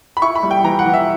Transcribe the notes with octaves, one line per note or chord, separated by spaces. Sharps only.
B5
E4 C#6
B5
G3
G5
E3 A#5
F#5
E3
E5